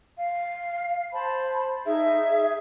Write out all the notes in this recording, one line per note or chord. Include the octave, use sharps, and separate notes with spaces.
F5
C5 A5 B5
D#4 G#4 E5
G#4